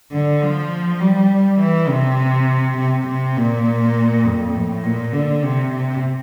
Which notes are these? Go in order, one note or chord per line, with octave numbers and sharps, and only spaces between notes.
D3
F3
G3
E3
C3
C3
C3
A#2
F2
A2
A#2
D3
C3
C3